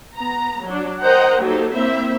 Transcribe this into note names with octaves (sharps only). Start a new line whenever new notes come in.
B3 A#5
F#3 D4
A#4 C5 D#5 F#5 G5 A#5
F#3 A#3 D#4 G4 A4 C5
A#3 C4 E4 C5 E5